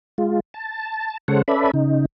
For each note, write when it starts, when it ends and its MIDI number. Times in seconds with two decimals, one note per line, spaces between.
0.18 0.40 56
0.18 0.40 65
0.54 1.17 81
1.28 1.42 49
1.28 1.42 56
1.28 1.42 69
1.28 1.42 72
1.28 1.42 73
1.28 1.42 78
1.48 1.71 61
1.48 1.71 69
1.48 1.71 71
1.48 1.71 74
1.48 1.71 76
1.48 1.71 83
1.74 2.05 49
1.74 2.05 63